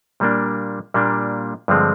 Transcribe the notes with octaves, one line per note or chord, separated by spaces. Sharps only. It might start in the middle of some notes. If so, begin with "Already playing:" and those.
A#2 G3 A#3 D4
A#2 G3 A#3 D4
G2 D3 F3 G#3 C4